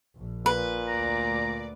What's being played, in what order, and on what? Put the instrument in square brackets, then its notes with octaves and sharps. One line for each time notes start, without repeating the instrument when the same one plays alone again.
[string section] A#1
[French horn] A#2 [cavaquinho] B4
[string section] D2 D5 [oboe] A#5